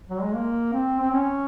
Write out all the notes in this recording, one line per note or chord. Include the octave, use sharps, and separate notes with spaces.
F#3
G#3
A#3
C4
C4
C#4